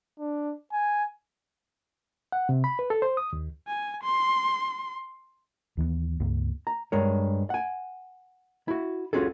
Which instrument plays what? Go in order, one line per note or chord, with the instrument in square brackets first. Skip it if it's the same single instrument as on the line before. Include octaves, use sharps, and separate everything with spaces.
[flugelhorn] D4
G#5
[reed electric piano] F#5
C3
B5
B4
A4
C5
D#6
D#2
[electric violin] G#5
C6
[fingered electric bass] D#2 E3 G3 B3
C#2 G2 A#3
[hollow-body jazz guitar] A#5
G2 G#3 A#4 C#5
F#5 G#5
E4 F#4
C#4 F4 F#4 G#4 A4